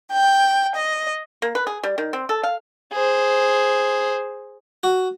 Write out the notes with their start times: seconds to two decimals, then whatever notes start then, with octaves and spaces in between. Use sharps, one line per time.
0.11 G5
0.74 D#5
1.42 A#3
1.55 B4
1.67 G#4
1.83 G3
1.98 D#3
2.13 C4
2.29 A4
2.43 F5
2.93 G#4 C5
4.83 F#4